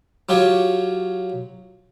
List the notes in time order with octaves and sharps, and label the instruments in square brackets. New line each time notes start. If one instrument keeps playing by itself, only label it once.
[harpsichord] F#3 F4 G4 C#5